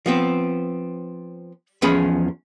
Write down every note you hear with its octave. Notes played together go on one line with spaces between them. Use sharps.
F3 B3 C4
E2 F3 C#4 G#4 B5